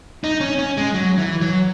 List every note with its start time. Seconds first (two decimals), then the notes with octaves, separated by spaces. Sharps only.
0.24 D#4
0.40 C#4
0.58 C#4
0.77 G#3
0.94 F#3
1.18 E3
1.41 F#3